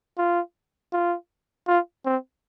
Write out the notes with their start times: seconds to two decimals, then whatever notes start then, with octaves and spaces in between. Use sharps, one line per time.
0.18 F4
0.93 F4
1.68 F4
2.05 C4